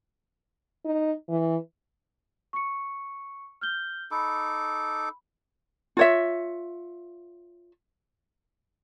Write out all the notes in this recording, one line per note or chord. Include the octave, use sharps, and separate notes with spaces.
D#4
E3
C#6 C#7
F6 G6 G7
D#4 A4 B5 D6
F4 C#5 E5